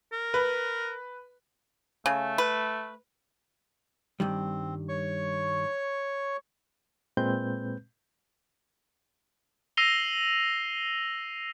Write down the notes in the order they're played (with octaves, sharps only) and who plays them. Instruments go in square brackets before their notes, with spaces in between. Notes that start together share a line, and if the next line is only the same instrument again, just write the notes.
[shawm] A#4
[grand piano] B4
[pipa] C#3 [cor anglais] A3
[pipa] B4
[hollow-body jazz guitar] G2 D#3 G3 [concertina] C4
[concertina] C#5 C#6
[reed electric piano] A#2 G#3 C4 B4 G6
[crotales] E6 A#6 C7 D#7 F7 G7